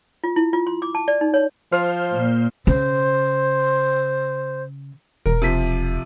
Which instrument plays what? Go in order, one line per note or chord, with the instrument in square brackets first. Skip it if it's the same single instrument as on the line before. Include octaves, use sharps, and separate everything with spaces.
[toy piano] F4
E4
F4
C6
D6
A5
D5
D#4
C#5
[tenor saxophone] F3 [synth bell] C5 F6
[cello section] A#2
[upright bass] C#3 [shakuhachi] C5
[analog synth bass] E1 [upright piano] A#4
[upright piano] C3 F3 B6